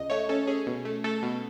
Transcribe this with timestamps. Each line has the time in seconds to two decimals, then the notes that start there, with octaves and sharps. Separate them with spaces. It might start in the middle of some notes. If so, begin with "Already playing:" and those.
Already playing: C#2 D#5
0.10 A3 C#5
0.29 C#4 A4
0.47 C#4 G#4
0.67 B2
0.85 A3
1.04 A3 A4
1.23 B2